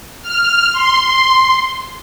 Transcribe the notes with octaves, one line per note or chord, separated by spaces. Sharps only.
F6
C6